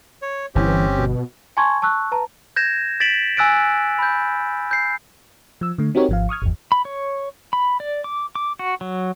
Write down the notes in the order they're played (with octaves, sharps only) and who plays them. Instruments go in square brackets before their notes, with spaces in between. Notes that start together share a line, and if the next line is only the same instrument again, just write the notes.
[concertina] C#5
[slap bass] G1 [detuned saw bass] E3 [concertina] C4 C#4 G4
[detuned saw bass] B2
[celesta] G#5 A5 C6 C#6 G#6
A5 C#6 E6 F#6
B4 A5 A#5
[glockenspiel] G6 G#6 A#6 E7
A6 B6 D7 E7 F#7
G#5 E6 F#6 A6 D7
B5 G6
G6 C7
[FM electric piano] F3 E6
D3 A3
C4 D#4 F#4 G4 A#4 C#5
G#1 F3 F5
C#6 D#6 F6 G#6
G1 E2
[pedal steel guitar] B5
C#5
B5
D5
D6
D6
F#4
F#3